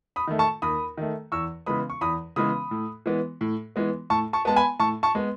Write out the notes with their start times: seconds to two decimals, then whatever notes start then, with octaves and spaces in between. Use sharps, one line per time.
0.16 B5 D#6
0.27 D#3 A3
0.39 A5 C#6
0.62 D#2 B5 D#6
0.97 D#3 A3
1.32 E2 C#6 E6
1.66 C#3 E3 G#3 B3 B5 D#6
1.90 C#6
2.01 E2 B5 D#6
2.36 C#3 E3 G#3 B3 B5 D#6
2.71 A2
3.06 E3 G#3 B3
3.41 A2
3.76 E3 G#3 B3
4.10 A2 A5 C#6
4.33 A5 C#6
4.45 G#3 B3 A5
4.56 G#5 B5
4.79 A2 A5 C#6
5.03 A5 C#6
5.15 G#3 B3